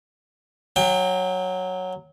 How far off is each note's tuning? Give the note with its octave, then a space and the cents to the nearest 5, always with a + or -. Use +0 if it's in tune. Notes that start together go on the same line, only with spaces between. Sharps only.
F#3 -5 G5 +30